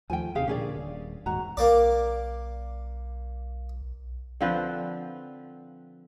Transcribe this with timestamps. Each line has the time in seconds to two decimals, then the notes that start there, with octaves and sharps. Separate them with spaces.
0.10 D#2 F3 A3 G5 G#5
0.35 D#2 C3 D#3 G4 G#4 F5
0.48 A#2 D3 C#4 G#4 D5
0.77 D#1
1.26 D#1 D#2 G#2 F#4 A#5
1.57 B1 A#3 D5
4.41 D3 F3 C4 B4